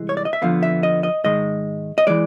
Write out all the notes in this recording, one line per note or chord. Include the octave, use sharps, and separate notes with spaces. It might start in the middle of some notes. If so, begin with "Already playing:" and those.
Already playing: C2 E3 G#3
C#5
D5
D#5
E5
F2 D3 F3 B3 F5
E5
D#5
D#5
G#2 D#3 G#3 D#5
D#5
E3 G#3 D5